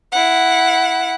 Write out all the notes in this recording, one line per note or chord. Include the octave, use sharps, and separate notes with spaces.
E4 F#5